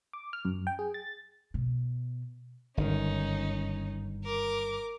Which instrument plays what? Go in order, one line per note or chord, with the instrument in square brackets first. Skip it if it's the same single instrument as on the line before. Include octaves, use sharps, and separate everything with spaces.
[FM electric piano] D6
F6
F#2
G5
G#4
A6
[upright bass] B2
[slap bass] G1 G#2 D#3 [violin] C#4 D#4
[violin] A#4 D6